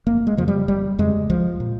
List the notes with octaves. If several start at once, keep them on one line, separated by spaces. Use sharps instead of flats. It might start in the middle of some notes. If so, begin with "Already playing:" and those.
F1 A#3
G#3
F2 C#3 F3
G3
F1 G3
F2 C#3 G#3
C2 F3
A#2